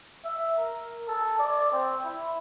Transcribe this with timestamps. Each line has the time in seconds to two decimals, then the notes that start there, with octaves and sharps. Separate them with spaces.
0.25 E5
0.59 A#4
1.07 A4
1.39 D5
1.72 C4
2.04 E4